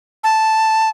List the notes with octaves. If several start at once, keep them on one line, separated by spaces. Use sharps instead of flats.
A5